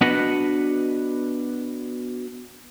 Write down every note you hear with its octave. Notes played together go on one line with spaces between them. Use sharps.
B3 D4 F#4 B4 D#5 F#5